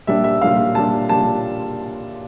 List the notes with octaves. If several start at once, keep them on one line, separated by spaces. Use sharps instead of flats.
A#2 G3 D4 E5
E5
A#2 G3 D4 F5
A#2 G3 D4 A5
A#2 G3 D4 A5